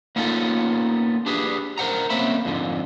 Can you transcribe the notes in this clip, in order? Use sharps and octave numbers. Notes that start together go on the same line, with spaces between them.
A#3 B3 C#4 D#4 F4 A4
D4 G4 G#4 B4
A#4 C5 F#5 A#5
C3 A#3 C4 C#4 E5 B5
F2 G#2 D3